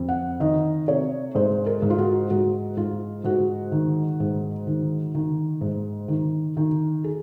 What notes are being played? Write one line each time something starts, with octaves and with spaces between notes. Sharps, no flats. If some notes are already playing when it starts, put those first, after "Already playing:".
Already playing: F2
F#5
D#3 D#5
C3 C#5
G#2 C5
A#4
G#2
F4
F#4
G#2 F#4
G#2 F4
G#2 F#4
D#3
G#2
D#3
D#3
G#2
D#3
D#3
G#4